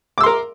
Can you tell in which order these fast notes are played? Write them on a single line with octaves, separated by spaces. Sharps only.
D6 E6 C6 A#4